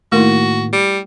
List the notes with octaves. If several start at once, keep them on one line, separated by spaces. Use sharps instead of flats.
A2 D#3 A3 A#3 E4 F#4
G3